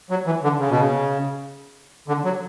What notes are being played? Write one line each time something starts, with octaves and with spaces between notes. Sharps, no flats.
F#3
E3
D3
C#3
B2
C#3
D3
F#3